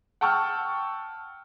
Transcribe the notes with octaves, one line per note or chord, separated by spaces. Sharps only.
F#5 G5 A5 C#6 E6 F6